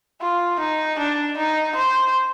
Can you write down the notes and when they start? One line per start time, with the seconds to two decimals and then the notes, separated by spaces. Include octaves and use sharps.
0.21 F4
0.59 D#4
0.99 D4
1.37 D#4
1.76 C5